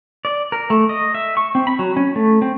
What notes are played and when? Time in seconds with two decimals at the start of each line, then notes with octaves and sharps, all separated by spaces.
0.25 D5
0.52 A#4
0.70 A3
0.89 D#5
1.15 E5
1.37 C#6
1.55 C4
1.67 B5
1.79 F#3
1.96 C#4
2.16 A3
2.42 C4